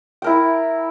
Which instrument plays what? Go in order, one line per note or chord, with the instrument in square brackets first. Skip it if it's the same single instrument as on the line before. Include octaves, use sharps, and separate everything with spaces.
[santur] E4 A#4 G5